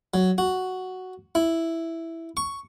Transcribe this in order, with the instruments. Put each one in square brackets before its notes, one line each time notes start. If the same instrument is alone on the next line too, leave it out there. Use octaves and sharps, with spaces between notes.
[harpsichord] F#3
F#4
E4
C#6